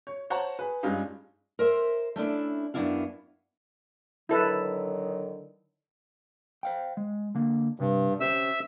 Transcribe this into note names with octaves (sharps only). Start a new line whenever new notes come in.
C#5
C5 C#5 F#5 A5 A#5
G#4 B4
G2 G3 G#3 C#4 D#4 F4
A#4 C5 E5
A3 C#4 D4 E4
F#2 C3 B3 D4 E4 F5
D3 D#3 F#3 E4 A4 B4
C5 F5 G5
G#3
D3 A#3
G2 C3
C#4 G4 C5 E5 E6